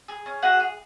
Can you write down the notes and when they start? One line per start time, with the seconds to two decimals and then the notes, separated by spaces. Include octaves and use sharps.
0.08 G#4
0.26 C#4
0.43 F#4 G#4 F#5
0.60 G#4